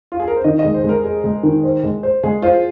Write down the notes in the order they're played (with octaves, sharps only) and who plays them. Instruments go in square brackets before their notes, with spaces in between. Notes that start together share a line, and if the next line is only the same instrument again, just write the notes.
[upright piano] F4
G#4
A#4
C5
[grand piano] D#3 [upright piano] D#5
[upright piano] D#5
[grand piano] G#3
[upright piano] C5
[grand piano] G#3 [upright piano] A#4
[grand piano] G#4
G#3
D#3
C5
G#3
C5
[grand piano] G#3 [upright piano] G#4
[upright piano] F4 [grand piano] C5